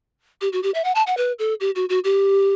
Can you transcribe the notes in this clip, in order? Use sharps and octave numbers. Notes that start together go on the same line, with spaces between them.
G4
F#4
G4
E5
F#5
A5
F#5
B4
A4
G4
F#4
F#4
G4